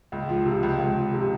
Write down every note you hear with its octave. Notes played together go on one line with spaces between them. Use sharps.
C#2
F3
C3
C#2
C#2
F3
C3